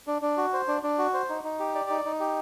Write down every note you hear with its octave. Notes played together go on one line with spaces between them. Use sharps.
D4
D4
F#4
C5
D4
D4
F#4
C5
D#4
D#4
G4
D5
D#4
D#4
G4